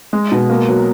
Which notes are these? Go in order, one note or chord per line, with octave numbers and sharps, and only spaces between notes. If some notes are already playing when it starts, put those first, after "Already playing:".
G#3
B2
A#3
F#3